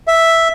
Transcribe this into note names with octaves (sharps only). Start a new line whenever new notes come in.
E5